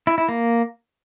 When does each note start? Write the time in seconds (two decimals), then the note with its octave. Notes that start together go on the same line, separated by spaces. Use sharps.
0.07 E4
0.18 E4
0.29 A#3